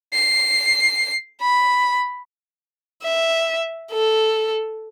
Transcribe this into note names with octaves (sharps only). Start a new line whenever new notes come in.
C7
B5
E5
A4